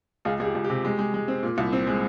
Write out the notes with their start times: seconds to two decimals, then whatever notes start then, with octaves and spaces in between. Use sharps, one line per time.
0.25 C#2 F4 G#4
0.40 C#2 G#4
0.45 G4
0.55 C#2
0.64 G4
0.70 C3
0.85 G#3
0.99 G#3
1.14 G#3
1.28 C4
1.43 A#2
1.58 C2
1.73 C4
1.87 G#3